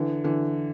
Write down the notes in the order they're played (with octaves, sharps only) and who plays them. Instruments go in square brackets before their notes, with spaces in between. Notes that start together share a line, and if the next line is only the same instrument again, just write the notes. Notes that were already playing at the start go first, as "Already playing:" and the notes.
Already playing: [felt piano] D3 E3
D3 E3